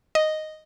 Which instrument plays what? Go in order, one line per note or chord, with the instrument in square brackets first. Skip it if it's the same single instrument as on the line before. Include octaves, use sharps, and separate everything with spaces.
[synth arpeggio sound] D#5